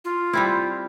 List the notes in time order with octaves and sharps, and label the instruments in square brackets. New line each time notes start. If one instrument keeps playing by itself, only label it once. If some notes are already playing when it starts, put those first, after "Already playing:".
[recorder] F4
[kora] G3 C4 E4